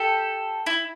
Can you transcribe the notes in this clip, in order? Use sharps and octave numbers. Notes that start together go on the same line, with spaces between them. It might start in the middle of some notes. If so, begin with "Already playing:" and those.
Already playing: G4 A4
E4